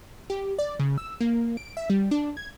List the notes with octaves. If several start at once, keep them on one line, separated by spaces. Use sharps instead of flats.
G4
D5
C#3
E6
A#3
D7
E5
G3
D4
G#6